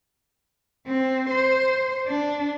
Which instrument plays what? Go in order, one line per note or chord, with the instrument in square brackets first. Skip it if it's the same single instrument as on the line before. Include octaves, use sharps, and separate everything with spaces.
[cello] C4
C5
D4